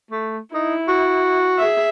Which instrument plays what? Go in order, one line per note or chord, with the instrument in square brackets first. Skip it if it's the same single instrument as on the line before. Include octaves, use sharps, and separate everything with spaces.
[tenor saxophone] A3
[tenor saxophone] D#4 [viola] E4
[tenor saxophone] F#4
[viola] G#4 E5